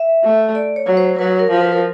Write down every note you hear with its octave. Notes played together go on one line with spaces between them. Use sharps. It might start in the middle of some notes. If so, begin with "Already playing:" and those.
Already playing: E5
A3
D5
C#5
F#3
C5
F#3 B4
A#4
F3
B4
A#4